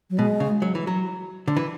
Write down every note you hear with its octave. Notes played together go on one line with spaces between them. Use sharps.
F#3
B2 G#3
C#3
F#3
E3
F#3
D3
E3